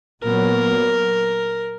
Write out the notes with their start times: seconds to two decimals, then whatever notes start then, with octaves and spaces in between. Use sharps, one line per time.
0.23 A#2 F#3 B3 A#4